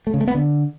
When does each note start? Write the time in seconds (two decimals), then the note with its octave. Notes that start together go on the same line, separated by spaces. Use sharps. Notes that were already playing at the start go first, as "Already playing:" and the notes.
0.07 A3
0.14 C#3
0.21 A3
0.28 B3
0.35 D3